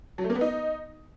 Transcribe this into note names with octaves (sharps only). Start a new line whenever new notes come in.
F#3
A3
A#3
B3
D#4